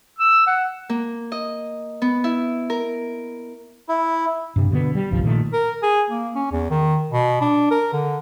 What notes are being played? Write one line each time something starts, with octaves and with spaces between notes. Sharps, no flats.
E6
F#5
A#3
D#5
B3
E4
A#4
E4
G2 C3
B2 D3 G#3 B3
G3
G1 C2 F3
A#2 D#3 G#3 A3
A#4
G#4
A#3
C#4
E2
D#3
B2
D4
A#4
D3